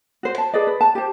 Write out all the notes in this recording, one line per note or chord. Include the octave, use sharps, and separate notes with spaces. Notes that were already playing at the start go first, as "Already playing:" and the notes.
F#4 C5
A5
G#4 B4 D5 D#5
B4
A5
G4 C5